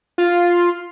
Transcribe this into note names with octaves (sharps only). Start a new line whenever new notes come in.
F4